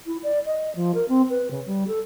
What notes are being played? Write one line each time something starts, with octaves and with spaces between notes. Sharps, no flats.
E4
D5
D#5
F3
A#4
C4
B4
C#3
G3
A4